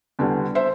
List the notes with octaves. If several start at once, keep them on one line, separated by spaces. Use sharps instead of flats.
E2 D3 G3
C5 E5